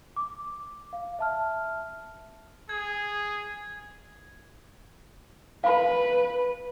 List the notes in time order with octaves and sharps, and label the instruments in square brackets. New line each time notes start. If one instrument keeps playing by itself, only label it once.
[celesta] D6
F5
E5 A5 F6
[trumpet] G#4 [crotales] G#6
[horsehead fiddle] B4 [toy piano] F5 B5